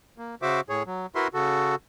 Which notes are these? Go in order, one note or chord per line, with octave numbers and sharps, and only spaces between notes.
A#3
C#3 F#4 C5 E5 D6
A2 G#4 C#5
F#3
E4 F#4 A#4 B4 E5 C6
C#3 F#4 A4